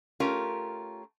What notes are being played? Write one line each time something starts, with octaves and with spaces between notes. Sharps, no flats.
A3 C#4 F4 G4 A#4